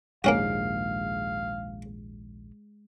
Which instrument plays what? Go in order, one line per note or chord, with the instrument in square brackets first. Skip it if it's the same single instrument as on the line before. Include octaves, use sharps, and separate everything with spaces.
[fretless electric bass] A#1 D#2 G#2 [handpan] G#3 [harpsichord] A#3 C#4 F#4 [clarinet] F5